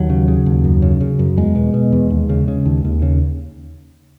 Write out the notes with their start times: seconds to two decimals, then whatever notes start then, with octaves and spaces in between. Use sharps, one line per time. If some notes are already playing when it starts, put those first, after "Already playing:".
Already playing: D#2 F#3
0.10 C#3
0.28 C#3
0.46 D#2
0.64 F#2
0.82 C#3
1.01 C#3
1.19 F#2
1.37 E2 G#3
1.55 B2
1.74 B2
1.92 E2
2.10 D#2
2.29 C#3
2.48 C#3
2.65 D#2
2.84 D#2
3.02 C#3